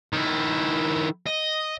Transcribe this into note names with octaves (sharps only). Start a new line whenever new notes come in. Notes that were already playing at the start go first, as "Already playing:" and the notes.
D#3 E4
D#5